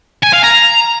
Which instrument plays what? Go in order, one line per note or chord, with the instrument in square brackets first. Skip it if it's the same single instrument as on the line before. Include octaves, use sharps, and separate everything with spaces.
[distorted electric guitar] G#5
F5
A#5